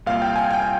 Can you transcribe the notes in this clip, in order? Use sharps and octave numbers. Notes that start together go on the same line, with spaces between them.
C2 A#2 F5
G5
G#5
G5